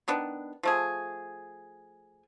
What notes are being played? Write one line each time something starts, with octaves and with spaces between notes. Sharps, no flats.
D#3 B3 D4
F3 A3 G#4